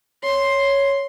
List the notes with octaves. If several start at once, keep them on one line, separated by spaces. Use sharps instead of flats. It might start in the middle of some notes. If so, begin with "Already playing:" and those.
C#5 C6